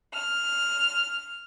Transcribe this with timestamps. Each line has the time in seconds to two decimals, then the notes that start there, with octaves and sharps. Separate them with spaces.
0.12 F6